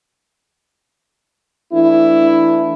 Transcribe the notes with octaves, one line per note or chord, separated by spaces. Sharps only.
E3 A3 D4 E4